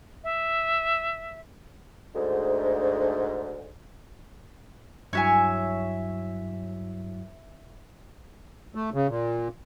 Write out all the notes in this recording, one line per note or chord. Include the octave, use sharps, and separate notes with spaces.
E5
D2 G#2
G2 F#3 E4 C#5 E5 G#5
A3
C#3
A#2